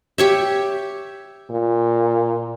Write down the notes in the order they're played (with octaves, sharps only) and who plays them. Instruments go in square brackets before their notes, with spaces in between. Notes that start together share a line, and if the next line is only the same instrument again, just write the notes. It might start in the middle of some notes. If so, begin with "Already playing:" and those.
[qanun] G4 C#5 E5
[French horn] A#2